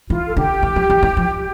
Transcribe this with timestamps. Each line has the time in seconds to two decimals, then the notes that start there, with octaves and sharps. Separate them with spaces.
0.09 E3 F4
0.27 A4
0.36 D3 G4
0.63 E3
0.76 F3
0.90 E3
1.03 E3
1.17 F3